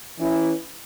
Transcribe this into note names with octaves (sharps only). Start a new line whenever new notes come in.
E3 C#4 E4